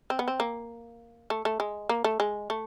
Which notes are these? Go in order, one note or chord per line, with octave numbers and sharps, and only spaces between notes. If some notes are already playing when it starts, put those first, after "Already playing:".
C4
B3
C4
A#3
A3
A3
G#3
A#3
A3
G#3
A3